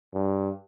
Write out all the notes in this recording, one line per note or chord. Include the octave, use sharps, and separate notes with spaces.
G2